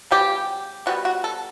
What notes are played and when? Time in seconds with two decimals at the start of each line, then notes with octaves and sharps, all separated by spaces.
0.11 C#3 G3 B3 G4
0.86 B2 G3 B3 F#4
1.05 F#4
1.24 A4